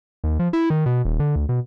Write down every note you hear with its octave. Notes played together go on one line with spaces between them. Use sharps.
D#2
F3
E4
D#3
B2
D#1
D3
D2
B2